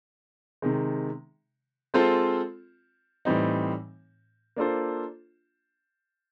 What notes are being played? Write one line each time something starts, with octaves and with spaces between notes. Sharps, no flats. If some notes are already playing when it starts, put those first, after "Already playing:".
C3 D#3 G#3
G#3 C4 F4 A4 C5
A2 E3 G3 C4 D#4
A#3 D4 F4 A4 C5